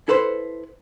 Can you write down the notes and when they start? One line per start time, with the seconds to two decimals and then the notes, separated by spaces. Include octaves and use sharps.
0.08 E4 A4 B4 C5